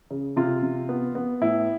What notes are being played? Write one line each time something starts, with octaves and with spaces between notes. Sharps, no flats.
C#3
C3 F4
C3
B3
B3
A2 E4